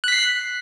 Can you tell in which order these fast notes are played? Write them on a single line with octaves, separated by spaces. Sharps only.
F#6 B6 C7